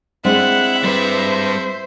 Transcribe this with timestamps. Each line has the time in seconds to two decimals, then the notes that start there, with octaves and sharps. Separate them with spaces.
0.25 G#3 C4 D4 E4 E5 F#5
0.84 G3 B4 C5